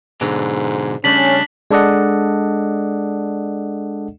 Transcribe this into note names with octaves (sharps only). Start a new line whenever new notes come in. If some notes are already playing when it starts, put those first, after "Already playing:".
G#2 B2 D3 F#3
C#3 G3 A3 C#4 D4 B6 F#7
G#3 D4 A4 D5 D#5 F#5